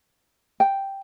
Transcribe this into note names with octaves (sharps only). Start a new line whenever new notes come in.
G5